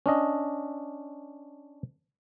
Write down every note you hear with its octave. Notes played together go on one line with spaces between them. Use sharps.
C#4 D4 D#5